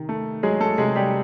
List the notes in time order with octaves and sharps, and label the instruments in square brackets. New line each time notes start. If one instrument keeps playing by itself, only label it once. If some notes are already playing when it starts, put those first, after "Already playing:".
Already playing: [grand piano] C3 D#3
A3
F#3 G#3 G#4
A3 A4
C3 G#3 G#4
G3 G4